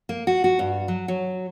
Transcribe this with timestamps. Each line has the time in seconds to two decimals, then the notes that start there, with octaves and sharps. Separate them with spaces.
0.09 A#3
0.27 F#4
0.44 F#4
0.59 G2
0.88 F#3
1.08 F#3